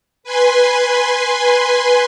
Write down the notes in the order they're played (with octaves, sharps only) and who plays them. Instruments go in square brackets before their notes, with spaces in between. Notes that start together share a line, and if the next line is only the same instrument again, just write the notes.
[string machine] B4 G#5 C6